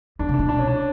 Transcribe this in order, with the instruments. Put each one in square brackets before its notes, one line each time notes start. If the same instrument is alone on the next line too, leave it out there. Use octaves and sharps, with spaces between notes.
[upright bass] E2 [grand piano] D4
[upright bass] C#3
[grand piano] D4
[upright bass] B2
[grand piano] D4
C#4
D4